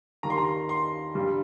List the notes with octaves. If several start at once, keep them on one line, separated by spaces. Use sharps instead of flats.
D#2 D#3 G3 A#5
C6
A#5
C6
G2 G3